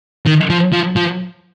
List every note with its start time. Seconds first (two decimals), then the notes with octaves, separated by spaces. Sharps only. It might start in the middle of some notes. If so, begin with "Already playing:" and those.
0.26 D#3
0.50 F3
0.73 F3
0.97 F3